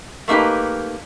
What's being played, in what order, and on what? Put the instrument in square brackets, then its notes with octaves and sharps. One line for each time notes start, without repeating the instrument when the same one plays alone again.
[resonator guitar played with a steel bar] A3 A#3 D#4 G4 B4